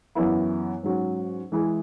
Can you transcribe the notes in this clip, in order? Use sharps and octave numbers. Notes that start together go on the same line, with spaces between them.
F#2 E3 B3 E4
G#2 F#3 C#4
E3 G#3 E4 G#4